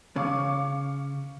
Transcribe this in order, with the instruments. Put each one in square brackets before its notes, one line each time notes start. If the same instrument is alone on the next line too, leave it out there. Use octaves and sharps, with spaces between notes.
[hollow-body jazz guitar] C#3 [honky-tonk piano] F5 C#6 D6